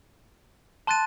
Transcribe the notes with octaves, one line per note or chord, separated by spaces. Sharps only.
A5 C6 F#6 A6 D#7